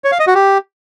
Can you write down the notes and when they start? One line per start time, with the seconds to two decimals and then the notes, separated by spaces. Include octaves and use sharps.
0.04 C#5
0.12 F5
0.19 D#5
0.27 F#4
0.35 G4